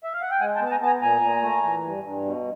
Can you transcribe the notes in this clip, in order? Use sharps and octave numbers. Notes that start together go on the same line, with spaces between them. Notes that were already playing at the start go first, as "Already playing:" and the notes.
E5
F5
F#5
G5
G#3 F#5 G#5
G5 A5
B3
A5
G#5 A#5
B3 A5
G#5 A#5
A#2 G#5 A#5
A#2
A3
E3
G2
G2
B2